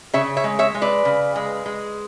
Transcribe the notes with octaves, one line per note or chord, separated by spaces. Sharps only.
C#3 C#5 E5
C#5 E5
G#3
C#5 E5
G#3
B4 D5
C#3
G#3
G#3